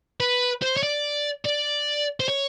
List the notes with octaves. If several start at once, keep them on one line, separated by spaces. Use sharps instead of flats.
B4
C5
C#5
D5
D5
C5
C#5